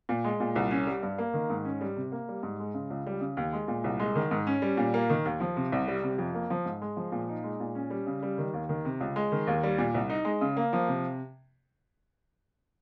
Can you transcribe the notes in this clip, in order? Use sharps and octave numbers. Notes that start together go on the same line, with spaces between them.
A#2
G#3
A#2
C2
C#4
G3
G2
A#3
D#3
G#2
C#4
G3
C3
A#3
G3
G#2
G#3
C#3
C#2
G3
C#3
D#2
G#3
A#2
C2
G#3
D#3
G#2
C#4
G3
A#2
A#3
D#3
D#2
F3
C3
C2
G3
C3
F2
A#3
F3
G#2
G#3
F3
A#2
D#4
G#3
A#2
C#4
G3
C#3
G3
D#3
D#2
D#3
C3
C#2
G#3
D#3
D#2
G3
A#2
C2
D#4
G#3
C#3
A#3
F3
C3